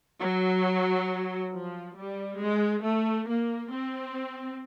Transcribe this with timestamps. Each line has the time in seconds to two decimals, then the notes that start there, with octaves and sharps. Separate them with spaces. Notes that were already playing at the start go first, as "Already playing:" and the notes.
0.21 F#3
1.52 F3
1.96 G3
2.39 G#3
2.84 A3
3.27 A#3
3.72 C4